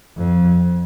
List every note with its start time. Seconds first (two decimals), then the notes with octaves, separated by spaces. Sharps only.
0.17 F2